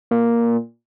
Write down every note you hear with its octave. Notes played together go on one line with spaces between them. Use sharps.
A#2